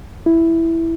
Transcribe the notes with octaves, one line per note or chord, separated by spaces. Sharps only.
E4